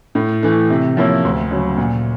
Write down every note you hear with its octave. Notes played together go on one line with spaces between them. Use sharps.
A2
E3 A3
C3
F3 A#3 C#4 E4
D2
C#3 F#3
A#2